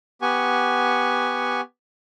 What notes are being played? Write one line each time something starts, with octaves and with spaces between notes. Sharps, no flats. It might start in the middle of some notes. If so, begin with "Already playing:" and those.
B3 G4 F#5 G#5 C#6